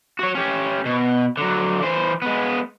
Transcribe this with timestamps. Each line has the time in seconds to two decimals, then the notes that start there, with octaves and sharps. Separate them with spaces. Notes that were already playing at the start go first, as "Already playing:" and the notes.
0.19 F#4 C#5
0.35 C#4 G4
0.85 B2
1.37 D3 F#3
1.82 E3 C5
2.22 G#3 B3